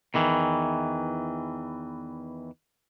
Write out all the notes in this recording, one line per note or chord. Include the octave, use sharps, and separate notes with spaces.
E2 D#3 E3